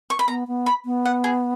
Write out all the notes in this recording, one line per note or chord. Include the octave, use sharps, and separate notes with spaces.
C#6
B5
B3 A#5
B3
B5
B3
F#5
G#4